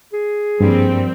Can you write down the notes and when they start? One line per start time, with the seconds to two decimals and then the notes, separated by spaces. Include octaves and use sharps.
0.13 G#4
0.61 G2 F3 G3 A#3 C4